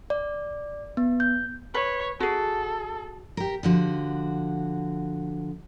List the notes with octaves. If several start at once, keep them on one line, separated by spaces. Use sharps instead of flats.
D5
B3
G6
B4 C#5
F#4 G#4 A4
G4 A#4
D3 F3 F#4